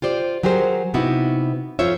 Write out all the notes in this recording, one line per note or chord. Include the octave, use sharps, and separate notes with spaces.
F4 G4 C5 D5
F#3 G4 G#4 A#4 C5
C3 B3 D#4 E4 F#4
F2 F4 C5 C#5 E5